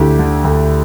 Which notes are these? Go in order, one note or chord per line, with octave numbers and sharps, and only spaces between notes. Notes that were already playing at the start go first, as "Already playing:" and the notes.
Already playing: D2 D3 E4 G4
D3
D2